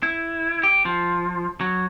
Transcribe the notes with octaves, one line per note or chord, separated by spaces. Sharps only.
E4
G4
F3
F#3